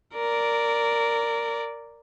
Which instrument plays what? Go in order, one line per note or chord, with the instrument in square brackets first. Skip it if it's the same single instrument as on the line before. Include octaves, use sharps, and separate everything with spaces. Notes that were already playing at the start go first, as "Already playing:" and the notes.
[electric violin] A#4 D5